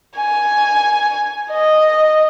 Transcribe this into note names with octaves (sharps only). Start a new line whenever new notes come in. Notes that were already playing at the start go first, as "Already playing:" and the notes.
G#5
D#5